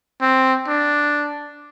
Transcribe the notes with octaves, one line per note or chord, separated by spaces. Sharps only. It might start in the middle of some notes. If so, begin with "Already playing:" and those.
C4
D4